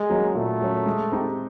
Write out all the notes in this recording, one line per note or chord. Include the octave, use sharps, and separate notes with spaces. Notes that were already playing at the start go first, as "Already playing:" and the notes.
Already playing: G#3
F#3 A#3 C#4
A#2 A3
F#3 A#3 C#4
G#3
C4 D#4 G4